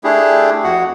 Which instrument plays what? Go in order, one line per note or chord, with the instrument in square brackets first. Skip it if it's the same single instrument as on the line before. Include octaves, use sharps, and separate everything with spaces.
[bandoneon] A3 D4 E4 G4 G#4
F2 F#4 F#5